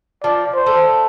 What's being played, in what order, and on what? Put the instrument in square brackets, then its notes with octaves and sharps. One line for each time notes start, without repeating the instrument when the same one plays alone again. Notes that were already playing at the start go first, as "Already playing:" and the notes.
[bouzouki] F3 [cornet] D5
[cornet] C5
[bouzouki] A3